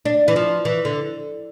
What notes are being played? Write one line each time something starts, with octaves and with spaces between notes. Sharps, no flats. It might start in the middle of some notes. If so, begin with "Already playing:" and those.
D4
E3
F3
E3
D3